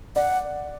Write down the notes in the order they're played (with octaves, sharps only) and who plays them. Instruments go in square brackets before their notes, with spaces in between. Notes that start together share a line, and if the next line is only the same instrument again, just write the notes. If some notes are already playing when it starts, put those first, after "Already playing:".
[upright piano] D5 [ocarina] F#5